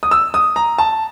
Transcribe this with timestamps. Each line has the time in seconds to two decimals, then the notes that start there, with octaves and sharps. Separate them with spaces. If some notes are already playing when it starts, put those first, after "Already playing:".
0.03 D#6
0.11 E6
0.34 D#6
0.56 A#5
0.78 A5